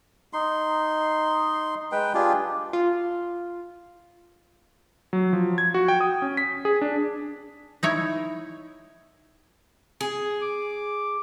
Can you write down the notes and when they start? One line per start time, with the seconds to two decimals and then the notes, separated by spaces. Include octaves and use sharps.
0.33 D#4 C6
1.92 G#3 B4 G5
2.14 D4 F4 G4 G#4
2.73 F4
5.13 F#3
5.33 F3
5.58 G#6
5.74 F#4
5.88 G5
6.01 D#6
6.22 C#4
6.37 B6
6.65 G#4
6.81 D4
7.83 D#4 E4 C#5
10.01 G#4
10.42 D6